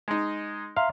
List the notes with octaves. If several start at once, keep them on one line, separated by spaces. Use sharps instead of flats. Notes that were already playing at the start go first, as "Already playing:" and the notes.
G#3 D#4
E5 F5 A#5 C6